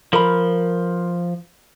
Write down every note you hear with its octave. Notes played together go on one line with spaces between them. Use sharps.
F3 A#4 B5